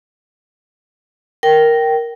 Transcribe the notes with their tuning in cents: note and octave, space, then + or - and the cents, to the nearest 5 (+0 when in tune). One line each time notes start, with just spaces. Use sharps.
A#4 +0 G5 -15